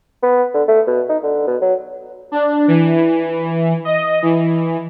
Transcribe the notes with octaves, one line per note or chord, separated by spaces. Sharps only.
B3
D3
A3
B2
D#4
D3
B2
F#3
D4
E3
D#5
E3